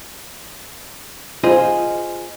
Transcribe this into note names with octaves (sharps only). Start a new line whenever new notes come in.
F4 G#4 C5 D#5